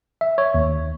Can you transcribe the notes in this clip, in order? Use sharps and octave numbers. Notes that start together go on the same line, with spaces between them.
E5
C#5
D#2